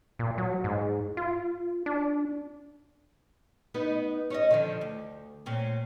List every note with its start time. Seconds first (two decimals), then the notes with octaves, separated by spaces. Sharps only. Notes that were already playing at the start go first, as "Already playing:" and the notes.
0.19 A#2
0.38 F#3
0.64 G#2
1.17 F4
1.86 D4
3.74 B3 D#4 B4
4.30 C#4 C#5 D#5
4.51 D3 D#3 F3
4.81 D2
5.46 A#2 C4 C#4